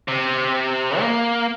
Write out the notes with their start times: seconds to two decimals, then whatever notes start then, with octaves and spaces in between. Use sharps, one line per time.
0.08 C3
1.00 A#3